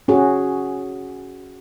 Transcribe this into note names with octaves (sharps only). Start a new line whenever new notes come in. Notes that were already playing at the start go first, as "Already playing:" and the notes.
C#4 F#4 G#4